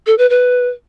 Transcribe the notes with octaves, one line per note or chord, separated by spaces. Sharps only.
A4
B4
B4